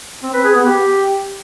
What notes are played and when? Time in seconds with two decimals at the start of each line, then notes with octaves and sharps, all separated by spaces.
0.23 C4
0.33 B4
0.44 G#4
0.55 B3
0.66 G4